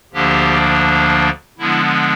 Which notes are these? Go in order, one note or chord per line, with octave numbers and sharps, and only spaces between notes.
D2 D3 F3 A#3 D4 G4
D3 F3 G#3 B3 D4 E4